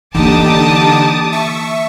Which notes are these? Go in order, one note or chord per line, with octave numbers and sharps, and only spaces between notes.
D3 E3 A#3 D#4 G4 A5 D6 D#6
E5 C#6